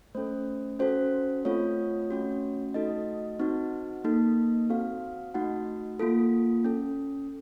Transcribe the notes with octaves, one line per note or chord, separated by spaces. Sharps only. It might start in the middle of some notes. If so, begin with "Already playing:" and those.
A3 C#4 A4 C5
C#4 F#4 A4 C5
A3 C4 F4 A4 C#5
A3 C#4 F#4
A3 D#4 F#4 A4 D#5
C4 D#4 F#4
A#3 D#4 A4
C4 F#4 A4 F5
A3 D#4 F#4 F#5
A#3 F4 A4
C#4 A4